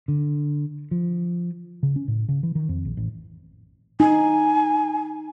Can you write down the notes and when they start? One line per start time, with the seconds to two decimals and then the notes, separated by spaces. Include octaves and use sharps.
0.08 D3
0.91 F3
1.83 C#3
1.96 C#4
2.08 A2
2.29 C#3
2.43 E3
2.55 D#3
2.69 F2
2.85 A#1
2.97 A1
4.00 D#4 G#5